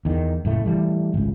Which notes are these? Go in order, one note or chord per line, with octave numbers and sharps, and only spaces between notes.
E2 D#3
F#1 A2 A3
E3 G3 A3
G#1 C#2